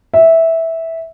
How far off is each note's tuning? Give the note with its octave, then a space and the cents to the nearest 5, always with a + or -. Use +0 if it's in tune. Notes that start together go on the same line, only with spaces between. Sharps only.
E5 -10